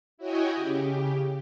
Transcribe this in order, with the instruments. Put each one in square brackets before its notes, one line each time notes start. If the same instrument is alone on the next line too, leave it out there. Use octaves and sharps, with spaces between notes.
[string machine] E4 F#4 C#5 D#5 G5 G#5
C#3 G4